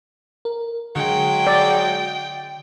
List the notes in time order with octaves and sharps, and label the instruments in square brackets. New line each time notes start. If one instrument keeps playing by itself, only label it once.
[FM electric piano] A#4
[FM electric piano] D3 [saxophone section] F#3 G#3 [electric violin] G5
[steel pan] D5